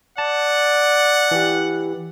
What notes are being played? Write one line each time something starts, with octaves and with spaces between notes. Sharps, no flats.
D5 F#5 A5
E3 G4